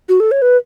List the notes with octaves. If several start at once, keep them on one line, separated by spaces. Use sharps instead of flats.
F#4
A4
C#5
B4